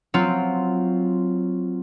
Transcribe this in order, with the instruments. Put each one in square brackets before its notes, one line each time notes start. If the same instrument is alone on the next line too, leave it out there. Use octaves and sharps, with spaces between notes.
[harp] F#3 C4 F4